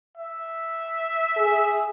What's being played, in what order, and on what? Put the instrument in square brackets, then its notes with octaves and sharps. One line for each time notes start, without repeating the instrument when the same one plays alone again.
[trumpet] E5
[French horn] G#4